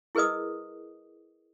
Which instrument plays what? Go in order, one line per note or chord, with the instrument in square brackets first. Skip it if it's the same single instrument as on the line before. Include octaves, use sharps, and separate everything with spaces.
[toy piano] E4 G#4 A#4 B4 D#5 D#6